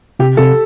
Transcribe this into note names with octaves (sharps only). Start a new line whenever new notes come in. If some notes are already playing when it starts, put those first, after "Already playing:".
C3 G4
C3 A4